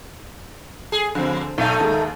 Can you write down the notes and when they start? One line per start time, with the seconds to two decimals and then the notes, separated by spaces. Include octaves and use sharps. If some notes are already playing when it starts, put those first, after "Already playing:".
0.92 G#4
1.15 F2 D3 C4
1.58 B1 A3 D#4 F5 G#5
1.80 D#2 D#3 G#3